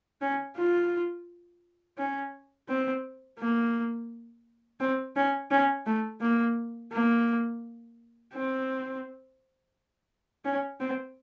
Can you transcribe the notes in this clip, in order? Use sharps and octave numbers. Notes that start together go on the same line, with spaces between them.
C#4
F4
C#4
C4
A#3
C4
C#4
C#4
A3
A#3
A#3
C4
C#4
C4